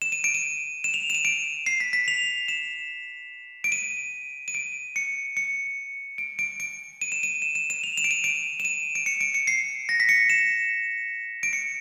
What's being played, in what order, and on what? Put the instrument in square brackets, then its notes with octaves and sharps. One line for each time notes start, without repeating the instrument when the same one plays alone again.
[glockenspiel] E7
D#7
D7
D#7
E7
F7
E7
D#7
D7
C7
B6
B6
F7
E7
D7
D#7
D#7
D7
C#7
C#7
D7
D7
D7
D#7
E7
D#7
E7
E7
E7
F7
E7
D7
D#7
D7
E7
D#7
D7
C#7
D7
C#7
C7
A#6
B6
C#7
E7
D7
C#7